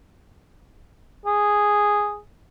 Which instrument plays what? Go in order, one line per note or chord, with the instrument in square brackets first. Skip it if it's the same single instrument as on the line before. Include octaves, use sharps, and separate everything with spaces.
[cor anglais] G#4